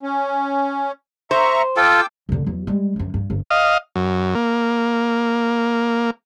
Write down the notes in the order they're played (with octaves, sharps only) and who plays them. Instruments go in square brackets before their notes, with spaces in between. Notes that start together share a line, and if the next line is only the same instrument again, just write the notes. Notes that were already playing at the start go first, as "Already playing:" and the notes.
[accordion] C#4
[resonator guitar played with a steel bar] C5 [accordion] E5 A#5 C#6
[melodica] F4 A4 [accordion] G5 D6 E6
[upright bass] F1 D3
E2 F#3
G3 G#3
G1 F#2
G2
G1
[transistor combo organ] D#5 F5
F#2
A#3